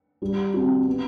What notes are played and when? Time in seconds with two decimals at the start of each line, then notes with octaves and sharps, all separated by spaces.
0.22 G3
0.54 C4 F#4
0.87 B3